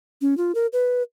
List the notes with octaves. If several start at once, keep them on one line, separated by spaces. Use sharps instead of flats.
C#4
F4
A#4
B4